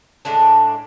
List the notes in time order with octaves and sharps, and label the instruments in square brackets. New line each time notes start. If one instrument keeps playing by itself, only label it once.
[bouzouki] A2 G#3 D4